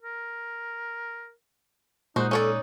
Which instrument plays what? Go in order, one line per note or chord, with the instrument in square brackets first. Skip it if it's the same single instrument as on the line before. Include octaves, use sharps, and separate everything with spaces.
[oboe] A#4
[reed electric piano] A#2 G#3 F#6 [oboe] D#4 [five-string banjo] F#4 C5
[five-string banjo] C#4 C#5 D5 [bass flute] A4